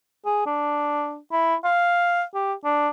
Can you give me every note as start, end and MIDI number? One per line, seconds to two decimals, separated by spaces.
0.26 0.45 68
0.46 1.17 62
1.32 1.55 64
1.64 2.23 77
2.34 2.53 67
2.65 2.89 62